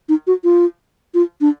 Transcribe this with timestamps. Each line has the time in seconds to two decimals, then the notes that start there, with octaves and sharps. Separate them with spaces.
0.09 D#4
0.27 F#4
0.44 F4
1.14 F4
1.41 D4